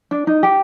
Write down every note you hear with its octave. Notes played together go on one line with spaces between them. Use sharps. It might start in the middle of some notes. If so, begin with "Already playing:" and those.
D4
D#4
G4